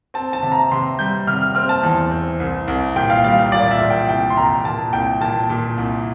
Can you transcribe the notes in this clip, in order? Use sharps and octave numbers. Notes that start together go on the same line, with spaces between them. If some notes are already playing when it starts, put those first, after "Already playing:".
C4 A5
A5
C3
A#5
C3 C6
G3 G6
C3 F6
F6
C4 F6
A5
E2
C4
C2
C2
A#2 G5
F5
G3 F5
F5
A#2 D5
E5
A#2
G5
C2 G5
C6
C2 A#5
A#2 A5
C2 G5
A#2 A5
A#2
C2